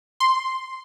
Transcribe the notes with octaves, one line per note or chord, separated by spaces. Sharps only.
C6